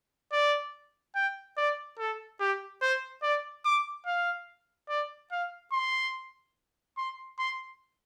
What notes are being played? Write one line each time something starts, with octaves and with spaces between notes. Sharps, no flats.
D5
G5
D5
A4
G4
C5
D5
D6
F5
D5
F5
C6
C6
C6